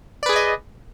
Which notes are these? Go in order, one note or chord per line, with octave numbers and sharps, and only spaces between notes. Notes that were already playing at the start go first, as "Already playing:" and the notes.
G#4 B4 D5 D#5 G#5